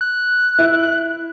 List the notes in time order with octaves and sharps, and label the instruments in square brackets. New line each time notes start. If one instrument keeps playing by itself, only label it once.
[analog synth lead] F#6
[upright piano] E4